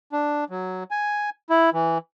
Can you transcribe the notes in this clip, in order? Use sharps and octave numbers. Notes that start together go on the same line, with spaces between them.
D4
F#3
G#5
E4
E3